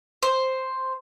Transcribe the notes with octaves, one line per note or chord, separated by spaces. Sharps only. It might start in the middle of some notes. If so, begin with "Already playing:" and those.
C5